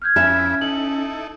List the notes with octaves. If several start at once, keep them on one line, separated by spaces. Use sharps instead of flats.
F6 G6 G#6
F2 C#4 E4 E5 A5 B5
D#4 E4 A4 F#7